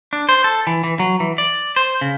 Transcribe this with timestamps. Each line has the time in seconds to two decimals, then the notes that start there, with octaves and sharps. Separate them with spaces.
0.13 D4
0.29 C5
0.44 A4
0.67 E3
0.84 E3
0.99 F#3
1.20 E3
1.38 D5
1.76 C5
2.01 C#3